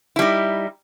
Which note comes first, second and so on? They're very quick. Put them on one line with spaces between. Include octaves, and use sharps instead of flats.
E4 G3 D#4